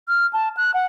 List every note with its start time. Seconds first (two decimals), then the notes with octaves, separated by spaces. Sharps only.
0.08 F6
0.33 A5
0.57 F#6
0.74 F#5